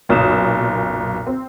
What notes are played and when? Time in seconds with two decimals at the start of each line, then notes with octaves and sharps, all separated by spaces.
0.09 F#1 B1 A#2 D#6 E7
1.27 C4